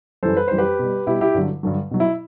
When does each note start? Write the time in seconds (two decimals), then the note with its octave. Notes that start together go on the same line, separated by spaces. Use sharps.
0.23 F#2 E3 G3 A4 C5
0.37 B4
0.48 F#2 E3 G3 C5
0.58 G4 B4
0.79 B2 G3
1.07 B2 G3 E4 G4
1.21 E4 G4
1.34 G2 D3 F#3
1.63 G2 D3 F#3
1.91 B2 F#3
2.00 E4